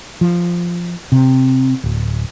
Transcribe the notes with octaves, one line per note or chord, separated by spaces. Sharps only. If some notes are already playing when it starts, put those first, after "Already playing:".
F3
C3
D1